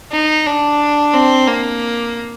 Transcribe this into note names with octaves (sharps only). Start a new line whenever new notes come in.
D#4
D4
C4
A#3